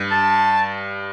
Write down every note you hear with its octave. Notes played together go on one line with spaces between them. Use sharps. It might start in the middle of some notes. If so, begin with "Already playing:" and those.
Already playing: G2
A5